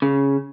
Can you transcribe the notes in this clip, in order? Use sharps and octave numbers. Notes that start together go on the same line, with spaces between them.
C#3